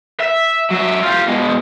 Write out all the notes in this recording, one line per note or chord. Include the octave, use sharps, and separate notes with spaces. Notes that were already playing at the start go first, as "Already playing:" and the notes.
E5
F#3 E5
F4 G4
B2 G#3